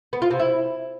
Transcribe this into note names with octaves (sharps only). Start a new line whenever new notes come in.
B3
F4
C3
E4